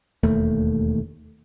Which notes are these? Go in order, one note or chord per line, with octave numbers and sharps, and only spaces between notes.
E1 D#2 A3